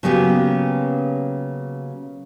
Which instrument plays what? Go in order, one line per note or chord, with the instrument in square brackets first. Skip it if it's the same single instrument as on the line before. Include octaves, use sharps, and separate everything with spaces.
[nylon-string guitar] C#3 F#3 A#3 B3 C#4 G4